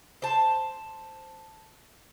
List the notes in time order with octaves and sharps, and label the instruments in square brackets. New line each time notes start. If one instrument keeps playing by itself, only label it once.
[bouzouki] C5 A5